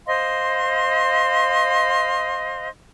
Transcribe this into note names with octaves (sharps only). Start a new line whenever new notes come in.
C5 D#5 F5 C6